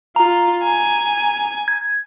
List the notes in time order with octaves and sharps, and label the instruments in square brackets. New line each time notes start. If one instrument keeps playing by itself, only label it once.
[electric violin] F4 [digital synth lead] A#5
[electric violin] G#5
[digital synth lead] G#6